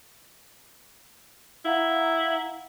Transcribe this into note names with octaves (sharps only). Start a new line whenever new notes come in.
E4 F5 F#5 A#5